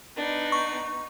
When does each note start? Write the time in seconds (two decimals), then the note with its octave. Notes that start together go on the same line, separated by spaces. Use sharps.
0.17 B3 D4 D#4
0.52 C#6